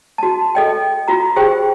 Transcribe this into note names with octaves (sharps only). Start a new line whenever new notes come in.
F#4 A5
A4 D#5 G5
F4 F#4 A#5
F4 G4 G#4 C5 G5